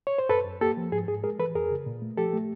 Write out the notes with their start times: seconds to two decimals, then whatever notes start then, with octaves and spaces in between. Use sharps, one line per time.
0.07 C#5
0.18 C5
0.29 F#2 A4 B4
0.45 F#2
0.61 A#3 G4 A4
0.77 F3
0.92 G#2 G#4
1.08 G#2 G#4
1.24 G#3 G#4 A#4
1.39 E3 A4 B4
1.55 F2 G#4 A#4
1.70 C#3
1.86 A#2
2.02 A3
2.17 F3 G4 A4
2.33 A3